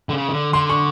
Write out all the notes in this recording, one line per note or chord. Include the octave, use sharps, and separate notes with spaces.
D3
C#3
D#3
D3
D3 C6
C#6